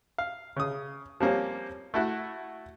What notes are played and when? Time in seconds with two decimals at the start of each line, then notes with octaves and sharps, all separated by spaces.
0.18 F5
0.56 C#3 D#6
1.20 F3 G3 A#3 C4 C#4
1.94 A3 E4 F#4